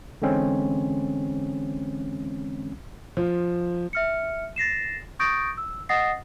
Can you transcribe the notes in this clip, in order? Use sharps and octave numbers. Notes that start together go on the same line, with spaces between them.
D3 E3 G#3 C4 C#4
F3
E5 F6 C#7
A6 A#6 C7 E7
C#6 D#6 G6 A6 A#6 D7
E6
D#5 F#5 D#6 A6 A#6 C7